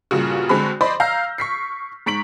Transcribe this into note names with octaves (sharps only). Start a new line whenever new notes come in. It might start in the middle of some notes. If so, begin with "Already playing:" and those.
G2 A#2 C#3 F#4
D3 G#3 C4 F#4 B5
C5 D5 D#5 B5 C6
F5 A#5 E6 F6 G6 A#6
C#6 B6 C7
G#2 C#6 B6 D7 F#7